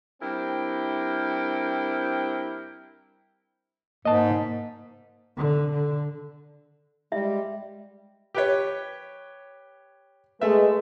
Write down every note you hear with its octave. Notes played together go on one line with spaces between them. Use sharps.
G2 C4 E4 A#4 G5
G#2 A#3 D#5 A5
D3
D3
G3 G#3 E5
G4 B4 C#5
G#3 A3 G#4 B4 E5